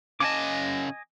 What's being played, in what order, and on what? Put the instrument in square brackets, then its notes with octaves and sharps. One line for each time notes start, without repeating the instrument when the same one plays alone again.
[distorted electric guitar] C#3 A5 [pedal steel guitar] D#5 G#5 D6